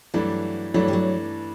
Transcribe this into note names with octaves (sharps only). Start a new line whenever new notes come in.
G2 E3 F#3 A3 D4
G2 E3 F#3 A3 D4
G3
F#3